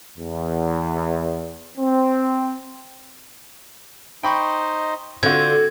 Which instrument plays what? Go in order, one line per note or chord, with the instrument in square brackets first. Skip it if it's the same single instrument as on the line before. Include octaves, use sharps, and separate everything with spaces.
[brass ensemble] E2
C4
[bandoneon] D#4 C5 D#5 [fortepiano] G5 B5 C#6
[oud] D3 [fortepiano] C4 F#4 [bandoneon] F4 G6 [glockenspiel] G#6